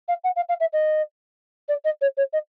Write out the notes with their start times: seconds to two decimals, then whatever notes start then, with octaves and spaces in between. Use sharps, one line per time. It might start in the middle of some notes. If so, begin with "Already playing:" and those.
0.08 F5
0.24 F#5
0.36 F5
0.49 F5
0.60 E5
0.73 D#5
1.69 D5
1.85 D#5
2.01 C#5
2.17 C#5
2.33 D#5